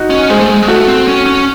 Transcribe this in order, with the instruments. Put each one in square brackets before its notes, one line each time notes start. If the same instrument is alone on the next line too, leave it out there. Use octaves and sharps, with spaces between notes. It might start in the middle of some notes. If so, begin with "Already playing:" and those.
Already playing: [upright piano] D#4 F#4
[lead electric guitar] C#4
[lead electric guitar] G#3 [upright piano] G#4 C5
[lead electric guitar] A3
G#3
G#3
[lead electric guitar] A3 [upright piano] F#4 A4
[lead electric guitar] C4
C#4
C#4